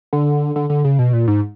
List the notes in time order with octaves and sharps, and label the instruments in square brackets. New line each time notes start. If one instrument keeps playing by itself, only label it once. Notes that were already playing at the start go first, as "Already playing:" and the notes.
[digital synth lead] D3
D3
D3
C#3
B2
A#2
G#2